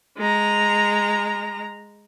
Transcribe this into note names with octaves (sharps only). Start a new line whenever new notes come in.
G#3 A#5